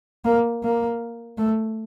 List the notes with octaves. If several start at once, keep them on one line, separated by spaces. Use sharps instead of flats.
A#3
A#3
A3